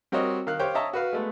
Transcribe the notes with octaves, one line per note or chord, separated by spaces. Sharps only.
G3 C4 F#4 A#4 C#5 D#5
D#3 F5 F#6
G4 C5 C#5 F5 G5
C#5 D#5 E5 A5 A#5
F#4 B4 F5
G#3 A3 B3